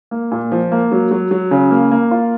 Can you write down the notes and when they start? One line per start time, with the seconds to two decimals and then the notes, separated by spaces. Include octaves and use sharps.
0.11 A#3
0.31 A#2
0.52 F3
0.72 A#3
0.92 F#3
1.11 F#3
1.31 F#3
1.51 C#3
1.71 A#3
1.91 A#3
2.11 F4